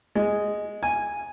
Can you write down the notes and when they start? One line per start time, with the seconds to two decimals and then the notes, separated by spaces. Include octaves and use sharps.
0.15 G#3
0.83 G#5